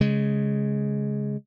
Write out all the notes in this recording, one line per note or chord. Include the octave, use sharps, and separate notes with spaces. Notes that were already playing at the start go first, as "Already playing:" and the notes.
C#3 G#3